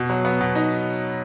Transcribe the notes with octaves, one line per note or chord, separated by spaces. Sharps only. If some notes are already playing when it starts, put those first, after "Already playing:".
Already playing: B2
F#3
B3
B2
D#4